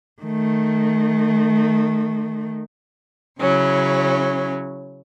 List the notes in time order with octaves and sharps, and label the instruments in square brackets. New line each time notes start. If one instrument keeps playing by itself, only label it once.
[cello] D#3 A3
[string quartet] C#3 F#3 C#4 E4